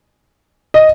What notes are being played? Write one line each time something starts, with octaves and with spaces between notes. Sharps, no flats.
D#5